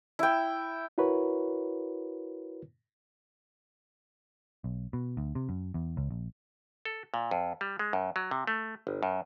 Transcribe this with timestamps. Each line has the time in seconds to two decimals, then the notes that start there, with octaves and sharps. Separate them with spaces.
0.19 E4 G5
0.98 E4 F#4 A#4 B4 C#5
4.64 B1
4.93 B2
5.17 D2
5.35 C3
5.49 F#2
5.74 E2
5.97 C#2
6.11 A#1
6.85 A4
7.14 A#2
7.31 F2
7.61 G3
7.79 G#3
7.93 F#2
8.16 F#3
8.31 C3
8.47 A3
8.87 G1
9.03 F#2